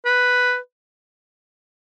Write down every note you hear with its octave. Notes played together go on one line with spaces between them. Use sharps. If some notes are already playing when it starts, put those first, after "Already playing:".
B4